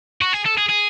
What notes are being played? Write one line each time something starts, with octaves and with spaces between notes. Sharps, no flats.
F#4
G#4
A4
G#4
G#4